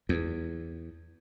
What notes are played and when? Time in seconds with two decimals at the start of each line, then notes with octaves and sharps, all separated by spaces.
0.09 E2